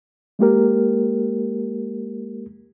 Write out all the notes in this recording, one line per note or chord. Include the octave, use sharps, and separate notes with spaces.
G#3 A#3 G4 A#4